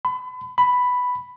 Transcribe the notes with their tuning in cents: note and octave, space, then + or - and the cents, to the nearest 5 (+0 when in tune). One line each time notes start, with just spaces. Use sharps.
B5 +35
B5 +5